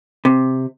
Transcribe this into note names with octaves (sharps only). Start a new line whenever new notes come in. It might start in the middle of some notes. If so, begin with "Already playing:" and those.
C3